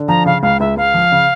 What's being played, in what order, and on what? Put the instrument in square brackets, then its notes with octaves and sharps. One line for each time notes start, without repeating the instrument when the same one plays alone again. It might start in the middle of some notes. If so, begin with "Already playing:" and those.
Already playing: [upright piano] D3
[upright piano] F3 [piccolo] A#5
[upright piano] C#3 [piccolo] F5
[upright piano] C#2 [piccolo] F5
[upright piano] C#2 [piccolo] E5
[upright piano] C#2 [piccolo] F5
[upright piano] F3
C#3